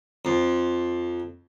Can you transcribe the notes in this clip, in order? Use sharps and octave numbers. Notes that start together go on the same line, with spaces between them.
F2